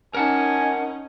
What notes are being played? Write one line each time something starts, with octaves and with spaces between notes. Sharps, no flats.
C#4 D#4 A#4 F#5 G#5 A5